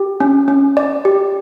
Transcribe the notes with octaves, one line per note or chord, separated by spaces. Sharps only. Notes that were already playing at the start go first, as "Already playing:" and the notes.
Already playing: G4
C#4
C#4
D5
G4